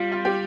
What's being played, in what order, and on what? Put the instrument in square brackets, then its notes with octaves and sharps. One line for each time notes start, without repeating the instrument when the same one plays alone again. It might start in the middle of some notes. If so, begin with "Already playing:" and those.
Already playing: [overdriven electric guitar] G3 [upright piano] F4
[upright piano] F4
G4